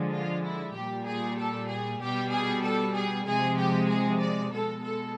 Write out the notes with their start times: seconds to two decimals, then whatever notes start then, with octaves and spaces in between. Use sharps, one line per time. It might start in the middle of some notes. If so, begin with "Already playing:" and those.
Already playing: D3 F3 G#3
0.12 F4
0.43 E4
0.74 A#2 G3 G4
1.05 G#4
1.37 A4
1.68 G#4
2.00 B2 G3 G4
2.31 G#4
2.62 A4
2.94 G#4
3.25 C3 F3 G#3 G#4
3.57 G4
3.87 G#4
4.20 D5
4.50 B2 G#3 A4
4.82 A4